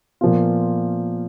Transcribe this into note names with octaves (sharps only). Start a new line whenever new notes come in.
A#2 F3 B3 F4